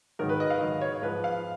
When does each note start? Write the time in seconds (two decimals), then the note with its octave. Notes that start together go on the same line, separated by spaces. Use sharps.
0.19 G#2 D#3 F#3 A#4
0.29 B4
0.40 D#5
0.50 F5
0.61 G#2 D#3 F#3 D#5
0.81 C#5
1.02 G#2 F3 B4
1.24 F5